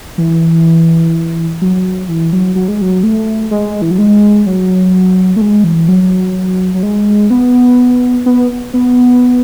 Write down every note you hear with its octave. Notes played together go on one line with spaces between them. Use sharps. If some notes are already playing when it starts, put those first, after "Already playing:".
E3
F#3
E3
F#3
F#3
G#3
F#3
A3
G#3
E3
F#3
G#3
F#3
A3
G#3
E3
F#3
F#3
G#3
B3
B3
B3